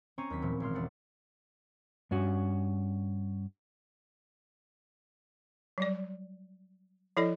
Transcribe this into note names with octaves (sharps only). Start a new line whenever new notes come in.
C4 C#4 A#5 C#6 D#7
D#2 F#3 B6
A#2 E3 F3 B3
G#1 G#3 C6 F6
E1 F#5 A6
G2 C#4 F#4
F#3 G3 D5
F3 E4 A4 D5 D#5